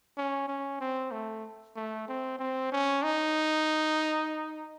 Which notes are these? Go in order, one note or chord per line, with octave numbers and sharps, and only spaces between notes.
C#4
C#4
C4
A3
A3
C4
C4
C#4
D#4